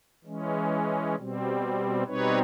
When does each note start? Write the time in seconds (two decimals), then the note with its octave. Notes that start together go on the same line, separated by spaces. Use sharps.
0.25 E3 G#3 C#4
1.16 B2 G3 C4
2.07 B2 G3 C4 D#4 B4 C#5